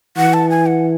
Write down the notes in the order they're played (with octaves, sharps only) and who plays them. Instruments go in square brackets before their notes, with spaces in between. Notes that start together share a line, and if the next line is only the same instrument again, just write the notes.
[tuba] E3 [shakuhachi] F#5
[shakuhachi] A5
G#5
F#5